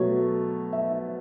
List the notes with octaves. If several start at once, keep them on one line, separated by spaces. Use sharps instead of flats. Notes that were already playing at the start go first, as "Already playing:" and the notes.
Already playing: B2 F#3 A3 C#5
E5